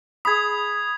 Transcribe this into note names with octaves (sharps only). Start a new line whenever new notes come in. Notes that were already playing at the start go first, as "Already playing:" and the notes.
G#4 B5 D#6 G#6